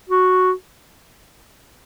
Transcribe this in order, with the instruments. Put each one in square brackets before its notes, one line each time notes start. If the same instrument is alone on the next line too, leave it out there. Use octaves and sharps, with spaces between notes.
[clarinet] F#4